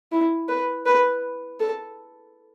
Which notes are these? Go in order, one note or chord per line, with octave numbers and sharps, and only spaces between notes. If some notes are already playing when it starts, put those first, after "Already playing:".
E4
B4
B4
A4